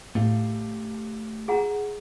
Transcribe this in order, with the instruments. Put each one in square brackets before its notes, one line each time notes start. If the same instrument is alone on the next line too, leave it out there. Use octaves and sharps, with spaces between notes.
[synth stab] A2 [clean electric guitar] A3 G4 F5
[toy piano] G#4 F#5 A#5